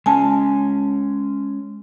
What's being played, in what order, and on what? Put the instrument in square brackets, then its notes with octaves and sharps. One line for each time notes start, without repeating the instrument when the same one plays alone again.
[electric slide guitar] G#3 C#4 [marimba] G#5 A5